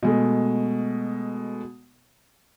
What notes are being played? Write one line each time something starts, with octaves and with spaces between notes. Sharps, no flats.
B2 G#3 A3